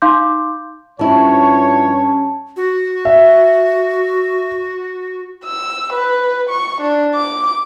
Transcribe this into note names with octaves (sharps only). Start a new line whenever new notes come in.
D#4 F5 C6 D6 G6
G2 F3 C#4 E4 C#5 A5
F#4
E5
E6
B4
C#6
D4
D6